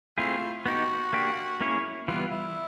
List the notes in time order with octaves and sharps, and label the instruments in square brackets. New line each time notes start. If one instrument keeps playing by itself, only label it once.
[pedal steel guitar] A3 C4 E4 G#4 [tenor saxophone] F4
[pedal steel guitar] B3 D#4 G4 [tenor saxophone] F#4
[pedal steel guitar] A#3 D4 G4
A#3 C#4 E4 G#4 C#5
[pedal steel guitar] E3 G3 B3 [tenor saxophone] F4
[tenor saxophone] E4